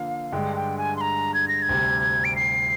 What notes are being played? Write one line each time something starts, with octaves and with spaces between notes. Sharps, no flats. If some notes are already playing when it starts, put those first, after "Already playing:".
Already playing: D3 F3 A#3 F5
G2 D3 G#3 G5
G5
G#5
C6
A#5
G#6
A#6
G#6
D2 C3 G3
D7
C7